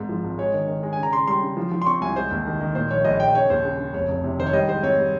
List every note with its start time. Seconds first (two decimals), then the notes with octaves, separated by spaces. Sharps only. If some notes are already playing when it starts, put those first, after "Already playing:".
Already playing: G#1 G#2
0.09 F3
0.24 G#1
0.38 G#3 C#5
0.54 D#3
0.68 D#3
0.83 G#3
0.93 G#5
0.98 C#3
1.03 A#5
1.13 C#3 C6
1.28 G3 C6
1.42 C#3
1.57 F3
1.72 F3
1.82 C6
1.86 C4 C#6
2.01 C2 G#5
2.16 G#3 C5
2.31 D#2
2.46 D#3
2.61 D#3
2.75 A#2 C5
2.91 A#1 C#5
3.05 A#1 D#5
3.20 A#1 G5
3.35 C#3 C#5
3.50 D#2 C5
3.65 C#3
3.79 C#3
3.94 F1 C#5
4.09 F1
4.24 C3
4.39 D#3 C5
4.46 C#5
4.53 G3 D#5
4.68 G#2 C5
4.83 C4 C#5
4.98 G3